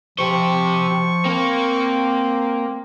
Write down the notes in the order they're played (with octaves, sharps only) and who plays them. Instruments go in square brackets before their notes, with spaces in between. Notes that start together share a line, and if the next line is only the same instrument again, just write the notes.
[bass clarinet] F3 [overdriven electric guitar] G4 C5 [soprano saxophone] C#6
[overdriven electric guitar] A#3 [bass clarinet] C4